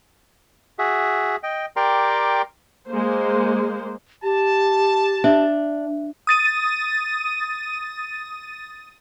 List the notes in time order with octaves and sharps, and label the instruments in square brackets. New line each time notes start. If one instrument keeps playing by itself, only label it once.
[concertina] F#4 G#4 E5
D#5 G5
G4 A#4 D5 G5 A#5 C6
[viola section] G#3 A#3 C5
[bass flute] G4 [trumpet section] A5
[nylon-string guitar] D4 [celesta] E5
[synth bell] D#6 A6 D#7